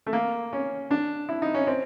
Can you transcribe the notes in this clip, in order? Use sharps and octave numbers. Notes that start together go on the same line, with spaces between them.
A3
A#3
C#4
D4
E4
D#4
C#4
C4